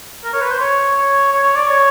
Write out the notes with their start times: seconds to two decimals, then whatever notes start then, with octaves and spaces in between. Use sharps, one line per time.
0.24 A#4
0.33 C#5
0.42 B4
0.51 C5
0.60 C#5
0.96 C#5
1.32 C#5
1.43 C#5
1.56 D5
1.67 C#5